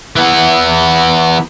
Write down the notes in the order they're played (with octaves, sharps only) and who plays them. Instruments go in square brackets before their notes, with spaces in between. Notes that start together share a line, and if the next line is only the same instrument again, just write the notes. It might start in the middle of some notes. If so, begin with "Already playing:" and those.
[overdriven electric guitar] E3 B3